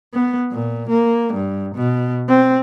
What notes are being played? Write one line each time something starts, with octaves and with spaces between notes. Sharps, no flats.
B3
A#2
A#3
G2
B2
C4